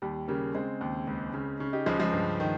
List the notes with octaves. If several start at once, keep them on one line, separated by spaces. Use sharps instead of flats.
D#2 G3
C#3 G3 A#3
C#3 G#3 C4
D#2
C#2
C#3
C#3
D#4 G4
C#2 F3 G#3
F3 G#3
G2
D#3